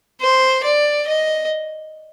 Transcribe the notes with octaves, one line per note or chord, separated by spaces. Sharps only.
C5
D5
D#5